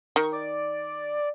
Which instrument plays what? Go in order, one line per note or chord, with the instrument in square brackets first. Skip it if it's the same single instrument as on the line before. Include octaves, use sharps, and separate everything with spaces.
[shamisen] D#3 [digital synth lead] C#6
[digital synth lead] D5